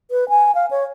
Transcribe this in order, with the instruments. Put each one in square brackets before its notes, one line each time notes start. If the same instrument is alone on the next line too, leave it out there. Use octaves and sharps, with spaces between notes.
[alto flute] B4
G#5
F5
C#5